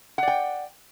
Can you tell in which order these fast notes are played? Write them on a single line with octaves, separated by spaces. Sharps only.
F#5 D5 G5